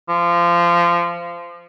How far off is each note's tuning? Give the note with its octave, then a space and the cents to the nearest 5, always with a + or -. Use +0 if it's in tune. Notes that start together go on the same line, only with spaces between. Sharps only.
F3 -20